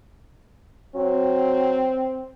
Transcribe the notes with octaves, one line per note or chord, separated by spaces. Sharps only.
F#3 C4